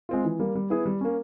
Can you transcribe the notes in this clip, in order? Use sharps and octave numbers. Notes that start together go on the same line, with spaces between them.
G#3 C4 F4
E3
G3 A#3
G3
B3 E4 G#4
G3
A#3 C#4